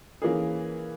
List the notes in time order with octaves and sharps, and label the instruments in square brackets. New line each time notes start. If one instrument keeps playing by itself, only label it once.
[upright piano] E3 A#3 C#4 G#4